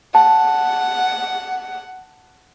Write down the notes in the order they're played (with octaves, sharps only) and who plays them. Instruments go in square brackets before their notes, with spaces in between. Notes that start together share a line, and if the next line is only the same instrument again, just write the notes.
[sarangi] F#5 [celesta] A5